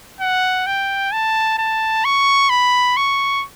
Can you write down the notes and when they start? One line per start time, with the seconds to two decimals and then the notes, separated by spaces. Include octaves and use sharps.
0.20 F#5
0.67 G5
1.12 A5
1.58 A5
2.05 C#6
2.50 B5
2.97 C#6